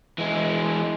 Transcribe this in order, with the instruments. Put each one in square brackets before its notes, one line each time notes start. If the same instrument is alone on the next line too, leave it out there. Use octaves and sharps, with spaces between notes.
[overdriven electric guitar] E3 G#3